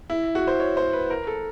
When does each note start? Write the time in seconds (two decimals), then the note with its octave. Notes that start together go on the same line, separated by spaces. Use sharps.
0.10 E4
0.35 F#4
0.47 C5
0.60 C#5
0.77 C5
0.93 B4
1.10 A#4
1.27 A4